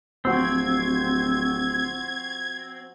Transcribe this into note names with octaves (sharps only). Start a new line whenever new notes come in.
D1 F3 C4 F#4 G#6